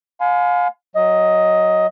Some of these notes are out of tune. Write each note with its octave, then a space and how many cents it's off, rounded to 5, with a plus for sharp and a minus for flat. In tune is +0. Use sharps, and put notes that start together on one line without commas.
F5 +30 G#5 +25 C6 -45
F#3 +0 D#5 +15